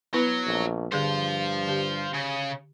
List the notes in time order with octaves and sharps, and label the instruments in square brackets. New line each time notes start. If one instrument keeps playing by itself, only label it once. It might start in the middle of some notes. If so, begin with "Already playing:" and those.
[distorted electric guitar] F#3 [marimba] B3 E4 B4
[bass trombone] A#1
[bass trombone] G2 [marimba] D3 G#4 G6 [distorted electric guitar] C5 F5
[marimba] D3 G4
[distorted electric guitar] C#3